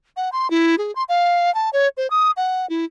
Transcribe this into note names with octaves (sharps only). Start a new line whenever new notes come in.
F#5
C6
E4
G#4
C6
F5
A5
C#5
C5
D#6
F#5
E4